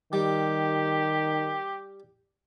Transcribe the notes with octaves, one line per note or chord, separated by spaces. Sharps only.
D#3 G3 G4